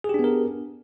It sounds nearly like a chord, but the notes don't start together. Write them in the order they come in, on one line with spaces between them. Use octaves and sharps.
G#4 G4 D4 B3 A#4